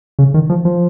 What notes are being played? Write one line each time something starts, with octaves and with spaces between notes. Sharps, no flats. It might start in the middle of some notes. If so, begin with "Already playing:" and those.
C#3
D#3
F3
F3